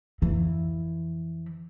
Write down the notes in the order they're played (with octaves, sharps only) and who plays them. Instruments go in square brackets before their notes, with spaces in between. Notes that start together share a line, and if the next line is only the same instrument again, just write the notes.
[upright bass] F2 E3